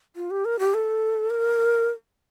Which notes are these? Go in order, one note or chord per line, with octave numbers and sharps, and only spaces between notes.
F4
G4
A#4
G4
A4
A#4